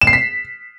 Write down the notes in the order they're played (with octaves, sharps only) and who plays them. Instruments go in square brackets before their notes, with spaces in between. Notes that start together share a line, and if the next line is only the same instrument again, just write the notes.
[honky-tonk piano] E7
C7
B6